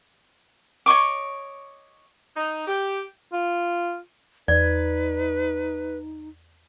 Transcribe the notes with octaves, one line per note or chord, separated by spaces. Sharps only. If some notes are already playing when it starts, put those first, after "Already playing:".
C#5 D#5 C#6 D6
D#4
G4
F4
E2 D#4 B4 D5